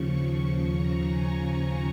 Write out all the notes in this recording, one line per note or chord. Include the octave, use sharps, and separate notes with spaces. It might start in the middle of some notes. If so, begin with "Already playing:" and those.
Already playing: D#2 C#3 F3 C#6
A#5
G#5